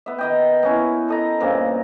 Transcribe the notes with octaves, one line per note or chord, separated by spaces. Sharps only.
B3 E5
D#3 D#5 G5
B3 C#4 E4
A4 D#5 A#5
G2 A#2 C#3 C4